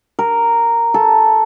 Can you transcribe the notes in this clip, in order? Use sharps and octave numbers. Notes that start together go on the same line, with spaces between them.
A#4
A4